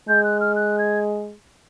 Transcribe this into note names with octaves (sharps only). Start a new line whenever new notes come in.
G#3 G6
F#6
F6
F#6
G#6